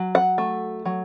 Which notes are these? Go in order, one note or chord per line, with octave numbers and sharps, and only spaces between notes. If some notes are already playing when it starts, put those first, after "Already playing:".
Already playing: F#3
F#5
A3
F#3